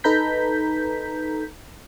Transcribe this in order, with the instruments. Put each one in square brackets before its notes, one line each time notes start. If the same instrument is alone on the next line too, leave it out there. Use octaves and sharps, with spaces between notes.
[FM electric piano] D#4 A4 B4 A#5 G6 B6